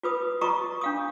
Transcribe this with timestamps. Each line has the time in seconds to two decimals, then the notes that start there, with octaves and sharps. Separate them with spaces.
0.03 F4 B4 D#6
0.41 F4 D#5 A#5 C#6 D#6
0.81 D4 F5 D#6